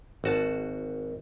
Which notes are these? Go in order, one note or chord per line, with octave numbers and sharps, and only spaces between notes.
G#1 F#4 A5